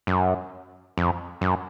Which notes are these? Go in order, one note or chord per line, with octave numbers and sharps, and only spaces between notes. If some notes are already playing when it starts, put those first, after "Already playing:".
F#2
F2
F#2